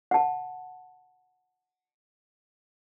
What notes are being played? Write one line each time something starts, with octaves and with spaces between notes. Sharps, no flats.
F#5 A5